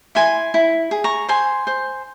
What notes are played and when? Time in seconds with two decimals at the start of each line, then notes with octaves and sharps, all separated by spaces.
0.15 E4 G#5 C6
0.54 E4
0.91 G#4
1.04 A#5 C#6
1.29 C5 G#5 C6
1.67 C5